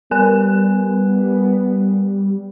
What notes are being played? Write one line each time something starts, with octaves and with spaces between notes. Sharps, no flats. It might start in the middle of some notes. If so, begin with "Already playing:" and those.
G3 B3 A#4 G#5 F#6